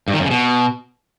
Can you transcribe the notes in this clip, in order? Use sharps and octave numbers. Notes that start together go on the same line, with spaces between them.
G2
D#3
F#2
C#3
B2